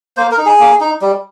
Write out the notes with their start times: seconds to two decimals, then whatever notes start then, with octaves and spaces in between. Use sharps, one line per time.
0.17 A#3 C5
0.31 A#4
0.38 D#4
0.46 G#4
0.60 A#3
0.81 D#4
1.02 G3